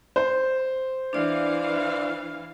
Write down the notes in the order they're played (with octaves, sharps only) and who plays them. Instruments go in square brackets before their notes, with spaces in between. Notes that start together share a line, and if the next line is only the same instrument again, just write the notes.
[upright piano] C5
[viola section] E3 F5 [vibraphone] D4 D5